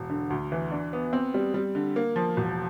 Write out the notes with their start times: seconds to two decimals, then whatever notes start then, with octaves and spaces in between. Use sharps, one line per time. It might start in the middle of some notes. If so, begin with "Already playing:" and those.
Already playing: E1
0.10 D3
0.30 D2
0.52 E3
0.72 D4
0.93 B3
1.13 C4
1.34 G3
1.54 G3
1.75 D3
1.96 A#3
2.16 F3
2.37 E1